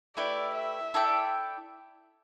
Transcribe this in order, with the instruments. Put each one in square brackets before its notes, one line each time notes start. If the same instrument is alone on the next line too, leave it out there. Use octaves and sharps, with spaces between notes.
[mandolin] A3 E4 G4 B4 [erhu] D5
[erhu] E5
[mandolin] E4 A4 D5 G5